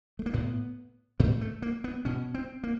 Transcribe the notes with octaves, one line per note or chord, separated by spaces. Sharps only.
A3
A#3
A2 B3
A2 A3
A3
A#3
B3
B2 C#4
C4
A#3